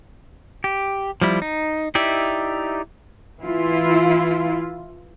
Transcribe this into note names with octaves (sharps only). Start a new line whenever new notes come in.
G4
F3 G3 E4
D#4
D#4 E4 G4 D5 E5
E3 E4 F4